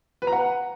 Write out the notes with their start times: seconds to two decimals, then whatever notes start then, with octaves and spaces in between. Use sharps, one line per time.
0.22 B4
0.27 A#5
0.33 F#5